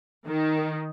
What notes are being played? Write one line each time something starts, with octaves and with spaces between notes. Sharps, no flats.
D#3